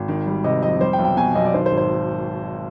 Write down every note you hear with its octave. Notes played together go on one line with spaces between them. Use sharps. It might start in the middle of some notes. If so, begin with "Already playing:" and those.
Already playing: G#1
D#3
G3
C3 D#5
F2 D#5
G3 C5
G5
B1
G5
B2 G#5
B1 D#5
D5
D#3 C5
C5
G#1
C5